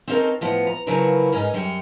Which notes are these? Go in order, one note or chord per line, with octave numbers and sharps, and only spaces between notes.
C4 C#4 D#4 F4 A4 A#4
A2 F3 B3
A#5
C#3 F3 F#3 E4 A#4 B4
G#2 C#4 D#4 A#4
F#2 G3 C#5 G5